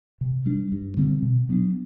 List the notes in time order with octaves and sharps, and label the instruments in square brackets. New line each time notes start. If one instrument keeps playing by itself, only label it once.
[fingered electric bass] C3
G3 D4
G2
D3 G3 C4
B2
F#3 B3 D4